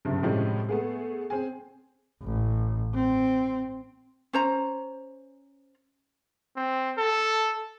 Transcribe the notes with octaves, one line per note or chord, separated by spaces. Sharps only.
F#1 C2 G2 C#3
A2 C3 F3 G3 G#3 C#4
A3 B3 G#4
C4 G#4 G#5
A1
C4
C#4 C5 A#5
C4
A4